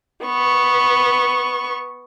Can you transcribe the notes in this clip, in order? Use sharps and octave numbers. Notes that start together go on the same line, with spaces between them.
B3 C#6